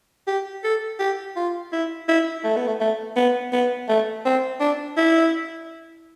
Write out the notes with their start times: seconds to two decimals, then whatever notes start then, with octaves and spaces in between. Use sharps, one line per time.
0.27 G4
0.64 A4
1.00 G4
1.36 F4
1.72 E4
2.08 E4
2.44 A3
2.56 B3
2.67 A3
2.80 A3
3.16 B3
3.53 B3
3.88 A3
4.25 C4
4.60 D4
4.97 E4